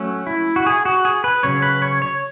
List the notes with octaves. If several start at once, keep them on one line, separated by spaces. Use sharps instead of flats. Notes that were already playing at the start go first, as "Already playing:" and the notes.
Already playing: F#3 A3 C#4
E4
F#4
G#4
F#4
G#4
B4
C#3 F#3 C#4 C#5
B4
C#5
C#5